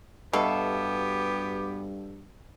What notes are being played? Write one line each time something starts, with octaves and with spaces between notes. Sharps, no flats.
G2 B2 B3 F#4 G4 A4 E5 F5